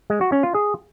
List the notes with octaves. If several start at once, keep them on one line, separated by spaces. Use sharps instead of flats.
G#3
F#4
C#4
F4
G#4